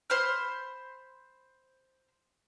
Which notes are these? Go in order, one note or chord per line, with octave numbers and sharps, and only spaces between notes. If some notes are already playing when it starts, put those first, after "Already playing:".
C5 B5 C6 F6